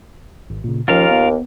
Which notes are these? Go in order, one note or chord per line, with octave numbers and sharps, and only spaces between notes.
G#1
A#2 C#3
D#2 F3 C#4 F4 A#4 F5
B3